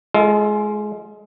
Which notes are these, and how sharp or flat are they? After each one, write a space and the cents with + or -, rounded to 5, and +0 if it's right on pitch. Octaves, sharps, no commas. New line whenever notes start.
G#3 +20 F4 -25 A4 +0